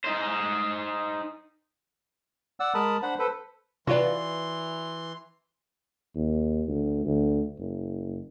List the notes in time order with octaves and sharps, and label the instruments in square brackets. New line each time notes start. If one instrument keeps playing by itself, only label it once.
[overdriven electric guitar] D#4 C5
[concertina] D5 F#5 E6
G#3 A#4 A5 B5 D#6
D4 C5 F#5 B5
A4 B4 C5
[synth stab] C3 F4 B4 [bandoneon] E3 C6 [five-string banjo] F#4 D5
[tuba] D#2
D2
D2
F#1